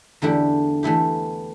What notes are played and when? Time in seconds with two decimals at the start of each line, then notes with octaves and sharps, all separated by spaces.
0.22 E2 D3 A3 E4 G4
0.83 E3 A3 E4 G4